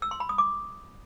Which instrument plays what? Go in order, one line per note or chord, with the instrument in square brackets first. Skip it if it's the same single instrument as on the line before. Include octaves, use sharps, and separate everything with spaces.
[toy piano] E6
C6
B5
D#6
D6